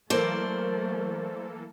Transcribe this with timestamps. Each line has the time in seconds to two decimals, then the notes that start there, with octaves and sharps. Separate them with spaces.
0.10 E3 F#3 A3 A#3 A4 A#4 C5 D5